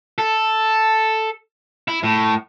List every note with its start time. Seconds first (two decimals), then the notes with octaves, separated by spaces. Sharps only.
0.18 A4
1.88 E4
2.04 A2